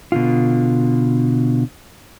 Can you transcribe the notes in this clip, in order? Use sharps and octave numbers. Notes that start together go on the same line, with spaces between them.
B2 D3 F4